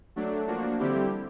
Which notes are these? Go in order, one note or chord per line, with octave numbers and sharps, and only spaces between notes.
F#3 A3 D4
F3 A#3 D4 F#4
D3 G3 C4 E4 G4